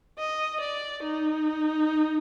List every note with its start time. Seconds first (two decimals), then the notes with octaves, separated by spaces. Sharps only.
0.18 D#5
0.61 D5
1.03 D#4